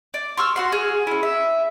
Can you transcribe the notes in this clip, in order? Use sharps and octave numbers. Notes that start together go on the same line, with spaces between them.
D5
C6 C#6 E6 F6
F#4 F#5 C6
G#4 F6
C#4 E4
E5